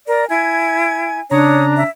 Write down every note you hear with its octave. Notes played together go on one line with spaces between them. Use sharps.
A#4 D5 A#5
E4 G#5 G#6
C#3 D4 C#5 A#5 D#6
E5